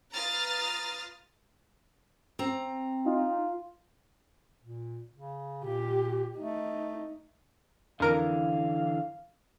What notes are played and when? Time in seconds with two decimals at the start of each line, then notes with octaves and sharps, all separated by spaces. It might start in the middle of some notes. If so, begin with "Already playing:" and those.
0.14 F4 B4 A#5 D#6 F6 A6
2.39 C4 A#5
3.06 D#4 F4
4.62 A#2
5.14 C#3
5.64 A#2 G4
6.39 A3 D#4
8.00 F2 D3 E3 A#4 F5 D7